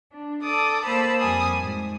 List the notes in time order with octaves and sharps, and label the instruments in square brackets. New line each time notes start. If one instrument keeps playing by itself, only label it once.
[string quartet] D4
A4 D5 D6 D#6
A#3 C5 A5 B5 E6
F2 G3 G#5 D#6
G#2